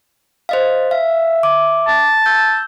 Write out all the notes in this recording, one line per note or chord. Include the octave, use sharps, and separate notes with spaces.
C5 D#5 F5
E5 F5
D6
A5
E6 G6